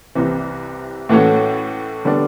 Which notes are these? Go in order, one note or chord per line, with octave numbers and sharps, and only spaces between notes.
C2 C3 E3
A2 E3 A3 C#4 F#4
D3 G3 B3 D4